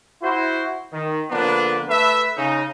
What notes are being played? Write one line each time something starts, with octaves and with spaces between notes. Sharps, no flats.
E4 F#4 C5
D#3
D3 F3 A#3 B3 D4 B4
A3 B4 E5
C#3 C#4 D#4